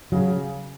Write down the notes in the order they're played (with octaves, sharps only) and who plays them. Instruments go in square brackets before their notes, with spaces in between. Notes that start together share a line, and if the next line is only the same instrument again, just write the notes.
[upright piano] C#3 [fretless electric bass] F#3